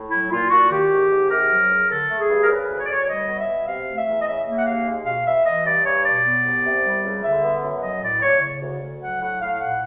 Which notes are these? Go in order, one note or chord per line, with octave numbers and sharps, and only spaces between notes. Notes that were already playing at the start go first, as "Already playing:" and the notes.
Already playing: A2
F#3 E4
A#2 F4
A#2 F#4
D#3 G4
G#2
G#2
C3 A#4
F#3
C#2
D3 A4
A3
G#4
G2
A#4
C#3 B4
D2
C#5
D5
D2 C#5
G3 D#5
B2
E5
B2
C3 F5
A3
E5
E2
D#5
C#3 E5
A#3 E5
F#5
D#2 F5
G#3
B2 F5
B2 E5
E3 D#5
G2 D5
G2 C#5
B2 D5
B3
C2
C3
G3
C#2
D3 E5
B3
F#2
F#3 D#5
A2 D5
A2 C#5
C#3
D2
D2
F#3 F#5
A2 F#5
A2 F5
A#2 F#5